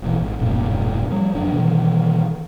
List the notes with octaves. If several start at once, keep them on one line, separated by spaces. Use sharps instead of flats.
E1 A#1 E3
G#1
D#1 F#2 A2 C3
F3 G3
F#1 F#3 D4
B2 D#3 E3